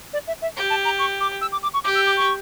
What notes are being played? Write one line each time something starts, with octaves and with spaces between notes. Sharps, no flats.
D5
E5
E5
G4
A5
A#5
C#6
D6
E6
D6
D6
C#6
G4 D6
E6
D6
C#6